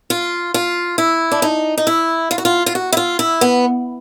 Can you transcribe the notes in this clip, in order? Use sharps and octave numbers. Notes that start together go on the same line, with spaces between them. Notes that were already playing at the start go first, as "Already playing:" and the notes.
F4
F4
E4
D4
D#4
D#4
E4
F4
F#4
F4
F4
F#4
E4
F4
E4
B3